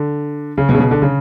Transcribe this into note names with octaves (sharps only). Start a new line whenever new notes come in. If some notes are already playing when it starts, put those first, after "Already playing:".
Already playing: D3
C#3
B2
C#3
B2
D3
C#3